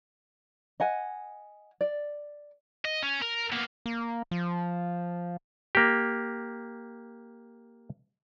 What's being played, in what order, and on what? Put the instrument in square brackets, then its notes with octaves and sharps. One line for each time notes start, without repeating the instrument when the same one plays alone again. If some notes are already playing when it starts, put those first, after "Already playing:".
[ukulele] D#5 F#5 G#5
D5
[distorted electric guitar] D#5
C#4
A#4
A#3 B3
[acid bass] A#3
F3
[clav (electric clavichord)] A#3 G4